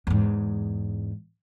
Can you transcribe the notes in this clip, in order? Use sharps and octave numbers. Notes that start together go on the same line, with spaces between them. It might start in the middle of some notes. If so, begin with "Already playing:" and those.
E2 G#2